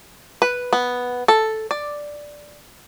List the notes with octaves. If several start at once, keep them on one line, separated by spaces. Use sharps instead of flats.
B4
B3
A4
D5